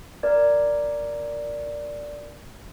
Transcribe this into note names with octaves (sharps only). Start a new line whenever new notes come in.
A#4 D5 G#6